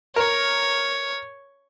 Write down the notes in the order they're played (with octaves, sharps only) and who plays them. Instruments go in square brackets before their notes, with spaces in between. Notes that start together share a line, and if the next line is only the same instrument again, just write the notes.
[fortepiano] A#4 [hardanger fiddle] C#5